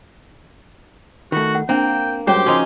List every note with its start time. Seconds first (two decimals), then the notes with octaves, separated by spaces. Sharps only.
1.32 D#3 A3 F4 F#4
1.55 F#5
1.69 A#3 C4 D4 G5
2.27 G2 F#3 G#3 C#4 G4 C5 C#5 G5
2.46 C#3 F3 C#4 D#4 F#4 C6